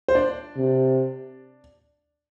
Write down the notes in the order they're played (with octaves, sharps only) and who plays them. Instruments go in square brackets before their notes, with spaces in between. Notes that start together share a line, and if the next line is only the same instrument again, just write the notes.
[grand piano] C5
D4 D5
[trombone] C3